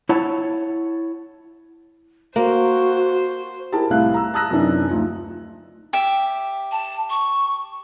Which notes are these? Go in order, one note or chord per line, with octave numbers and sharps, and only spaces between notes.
E4 C#5 F#5 A5
A#3 F#4 C5
E4 G4 G#4 A#4 A5
C2 A2 E4 E5 F5 F#6
A#5 E6
A5 A#5 D#6 E6 F#6 A#6
F#2 C3 E3 D4 D#4
D2 F3 D#4
G4 E5
A5
C#6